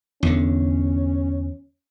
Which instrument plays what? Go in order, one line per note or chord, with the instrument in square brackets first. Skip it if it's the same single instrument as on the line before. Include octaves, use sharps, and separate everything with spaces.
[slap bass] E2 D3 [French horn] C#4